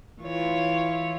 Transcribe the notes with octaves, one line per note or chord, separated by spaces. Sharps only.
E3 F4 C#5